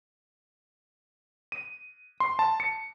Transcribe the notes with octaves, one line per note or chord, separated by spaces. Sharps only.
D#7
C6
A5
C#7